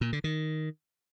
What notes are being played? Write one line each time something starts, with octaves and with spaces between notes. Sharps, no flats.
A#2
D3
D#3